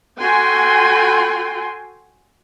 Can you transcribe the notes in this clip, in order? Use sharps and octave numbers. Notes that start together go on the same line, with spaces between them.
F#4 A4 G5 G#5 C6